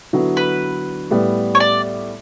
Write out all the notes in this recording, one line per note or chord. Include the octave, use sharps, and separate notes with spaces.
D3 F#3 B3 E4
B4
A2 G3 B3
C#5
D5